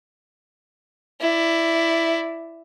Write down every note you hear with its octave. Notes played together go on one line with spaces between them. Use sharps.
E4 D5